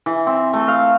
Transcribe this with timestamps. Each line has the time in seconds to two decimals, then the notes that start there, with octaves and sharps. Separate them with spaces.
0.06 E3
0.27 C4
0.53 A3
0.68 F5